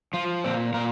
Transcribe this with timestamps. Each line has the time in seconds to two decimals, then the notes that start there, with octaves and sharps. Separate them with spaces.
0.13 F3 F4
0.44 A#2 C4
0.74 A#2 A#4